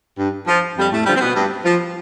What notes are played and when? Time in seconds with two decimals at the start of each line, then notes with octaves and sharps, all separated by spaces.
0.17 G2
0.47 F3
0.77 F2 G3
0.91 A2 A3
1.05 D3 F3 G3
1.16 C4
1.20 B2 B3
1.35 G2
1.64 F3